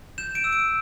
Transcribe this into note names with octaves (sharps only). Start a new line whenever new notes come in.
G6 E7
D7
E6
D7